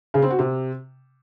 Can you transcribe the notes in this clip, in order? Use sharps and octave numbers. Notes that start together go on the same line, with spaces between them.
C#3
C4
F#4
C3